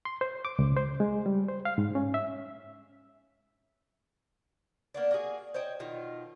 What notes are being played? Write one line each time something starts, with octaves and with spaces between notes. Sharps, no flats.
C6
C5
D6
C#2
C5
G#3
G3
C5
F5
G#2
C#4
E5
A#3 B3 D4
A#3 D4 F#4 G#4
C5 C#5 D#5 G5
B2 D#3 D#4 F4